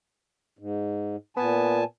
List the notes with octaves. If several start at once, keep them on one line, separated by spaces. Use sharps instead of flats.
G#2
A#2 B3 G#5 A5